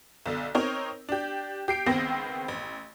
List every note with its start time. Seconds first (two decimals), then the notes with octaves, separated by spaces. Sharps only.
0.26 B1 D3
0.55 C4 D#4 A#4 C#5
1.09 D4 G4
1.68 G4 C7 D7
1.86 C#2 D#3 B3 C4 G5 A#6
2.48 A1